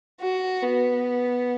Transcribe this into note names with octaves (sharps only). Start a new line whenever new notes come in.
F#4
B3